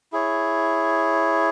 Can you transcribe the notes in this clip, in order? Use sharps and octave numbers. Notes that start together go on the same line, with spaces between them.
E4 G#4 C#5